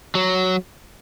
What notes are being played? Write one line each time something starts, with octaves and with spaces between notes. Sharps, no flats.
F#3